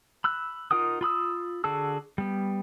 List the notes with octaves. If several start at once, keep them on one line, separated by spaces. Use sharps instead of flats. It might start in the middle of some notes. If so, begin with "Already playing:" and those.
B5 E6 F#6
D#4 F4 A#4 F#5 D#6
F4 B5 D#6 E6
D3 F#4 G#4 A5 E6
G3 B3